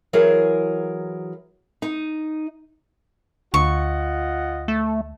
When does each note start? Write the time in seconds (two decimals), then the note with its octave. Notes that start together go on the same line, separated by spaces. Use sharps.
0.13 E3 F#3 G#4 A#4
1.82 D#4
3.54 D2 F4 D#5 F#5 C#6
4.68 A3